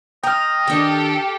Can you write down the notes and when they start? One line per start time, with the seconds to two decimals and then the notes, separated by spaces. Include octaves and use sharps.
0.23 D#5 G5 A#5 F6
0.67 D#3 D4 G4 A4